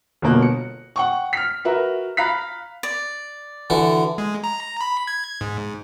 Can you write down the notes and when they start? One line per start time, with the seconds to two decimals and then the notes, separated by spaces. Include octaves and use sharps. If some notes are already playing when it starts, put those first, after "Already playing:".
0.22 G1 B2 A#3 F#6
0.42 C#7
0.96 F#5 G5 C#6
1.33 F6 B6
1.65 F#4 A#4 B4 E5
2.17 F5 A#5 B5 F#6 B6
2.83 D5
3.70 D3 E3 F#4
4.18 G#3
4.44 A#5
4.81 B5
5.07 G#6
5.41 G#2